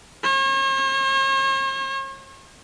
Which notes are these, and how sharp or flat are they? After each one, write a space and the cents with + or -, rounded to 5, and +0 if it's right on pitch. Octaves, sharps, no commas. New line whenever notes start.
C#5 -45